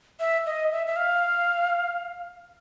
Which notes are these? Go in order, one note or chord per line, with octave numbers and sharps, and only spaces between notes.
E5
D#5
E5
E5
F5